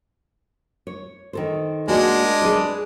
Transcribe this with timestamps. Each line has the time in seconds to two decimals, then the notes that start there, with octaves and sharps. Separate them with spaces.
0.87 C#5
1.33 D#3 A4 C5
1.88 G#3 A#3 D4 F#4
2.42 G#4 B4 D5